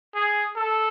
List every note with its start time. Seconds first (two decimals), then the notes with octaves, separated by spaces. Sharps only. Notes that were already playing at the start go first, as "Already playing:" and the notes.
0.15 G#4
0.56 A4